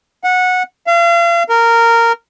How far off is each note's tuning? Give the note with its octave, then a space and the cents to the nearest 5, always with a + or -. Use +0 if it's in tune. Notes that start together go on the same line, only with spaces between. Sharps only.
F#5 -15
F5 -40
A#4 -10